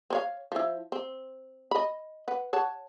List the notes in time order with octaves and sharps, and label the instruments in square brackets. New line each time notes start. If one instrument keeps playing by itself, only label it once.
[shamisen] C4 C#5 F5
F3 E4
C4
D#5 B5
B4 F#5
C#5 F#5 A5